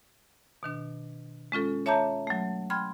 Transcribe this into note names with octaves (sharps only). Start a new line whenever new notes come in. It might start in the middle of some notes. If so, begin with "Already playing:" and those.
B2 D#3 D4
G#3 C#4 F4 A4
C#5 E5 A5 A#5 D6 G6
F#3 A3
G5 B5 C6 F6 G#6